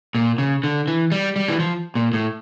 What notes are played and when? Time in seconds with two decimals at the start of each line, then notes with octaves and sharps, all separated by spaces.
0.15 A#2
0.38 C#3
0.64 D3
0.87 E3
1.12 G3
1.36 G3
1.48 E3
1.60 F3
1.95 A#2
2.13 A2